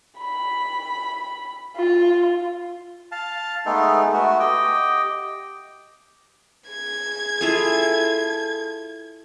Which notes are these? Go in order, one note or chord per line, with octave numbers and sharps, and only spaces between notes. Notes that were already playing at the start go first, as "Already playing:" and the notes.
B5
F4
F5 A5
G#3 A3 B3 D#4 A4
A3 B3 F#4
G4 D#5 G5
G#4 G#6
E4 F4 G#4 A4